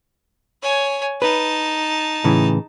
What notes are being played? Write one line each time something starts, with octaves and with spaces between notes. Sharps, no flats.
C#5 G#5
D#4 B4 A5
A2 C#3 E3